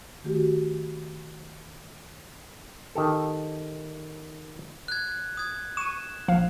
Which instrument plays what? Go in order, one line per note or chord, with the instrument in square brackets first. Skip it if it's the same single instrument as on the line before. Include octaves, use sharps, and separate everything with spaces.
[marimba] D#3 A3 F#4 G4
[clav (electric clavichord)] D#3 G4 A4
[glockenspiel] F#6 G#6
D#6 G#6
[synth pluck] C#6 D#7 [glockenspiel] E7
[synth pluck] A#1 F3 F5